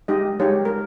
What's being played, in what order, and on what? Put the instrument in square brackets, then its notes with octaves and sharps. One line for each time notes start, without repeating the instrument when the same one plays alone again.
[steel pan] G#3 D#4 G4 D#5
G#3 D#4 G4 C#5
A#4